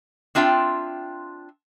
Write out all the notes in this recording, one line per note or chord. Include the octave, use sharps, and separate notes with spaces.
C4 D4 F4 E5 G5